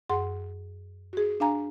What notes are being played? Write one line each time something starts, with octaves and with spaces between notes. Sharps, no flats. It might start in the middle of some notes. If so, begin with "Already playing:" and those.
F#2 G#4 F#5 C6
F#4 G#4
D4 F5 G#5 A#5